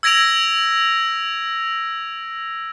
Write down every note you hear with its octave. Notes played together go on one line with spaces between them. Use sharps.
E6 G#6 A#6 D7 F7